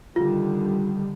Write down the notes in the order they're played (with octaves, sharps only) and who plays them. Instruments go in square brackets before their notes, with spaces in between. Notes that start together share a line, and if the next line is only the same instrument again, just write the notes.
[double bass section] D3 D#3 G3 [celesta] F4